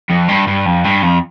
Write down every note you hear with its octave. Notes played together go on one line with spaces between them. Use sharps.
F2
G2
G2
F2
G2
F2